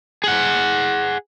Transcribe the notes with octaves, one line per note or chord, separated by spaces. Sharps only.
G#4 F#5